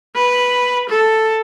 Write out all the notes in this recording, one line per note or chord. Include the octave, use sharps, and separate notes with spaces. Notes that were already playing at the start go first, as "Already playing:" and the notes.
B4
A4